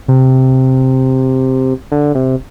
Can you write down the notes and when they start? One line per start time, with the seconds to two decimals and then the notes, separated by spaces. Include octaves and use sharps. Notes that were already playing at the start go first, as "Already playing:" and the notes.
0.08 C3
1.92 D3
2.15 C3